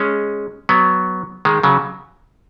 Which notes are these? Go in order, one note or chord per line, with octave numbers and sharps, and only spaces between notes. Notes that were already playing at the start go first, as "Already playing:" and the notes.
Already playing: G#3 C#4
F#3 B3
D#3 G#3
C#3 F#3